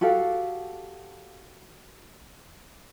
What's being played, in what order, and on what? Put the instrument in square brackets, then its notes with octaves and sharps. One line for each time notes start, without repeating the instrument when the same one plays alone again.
[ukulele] F#4 G4 A4 F5